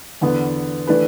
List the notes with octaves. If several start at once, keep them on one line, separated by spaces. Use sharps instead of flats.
E2 D3 B3
E3 A3 D4 B4